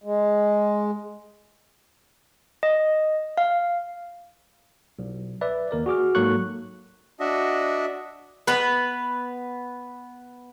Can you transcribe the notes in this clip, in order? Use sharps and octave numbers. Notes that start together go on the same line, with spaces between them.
G#3
D#5
F5
B1
B4 D5 E5
D#2 A#4 D5
F#4 G#4 D6 F6
G#2 F#3 A#3 A4 C#6 F#6
D4 F#4 D#5 E5
B3 B4